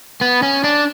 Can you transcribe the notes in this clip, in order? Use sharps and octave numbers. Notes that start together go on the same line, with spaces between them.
B3
C#4
D4